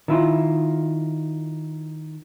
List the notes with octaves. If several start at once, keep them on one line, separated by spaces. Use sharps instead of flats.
D#3 E4 F4